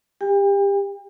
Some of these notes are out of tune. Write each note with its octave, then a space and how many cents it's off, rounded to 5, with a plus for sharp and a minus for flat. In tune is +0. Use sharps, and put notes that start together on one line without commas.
G4 +25 G5 +40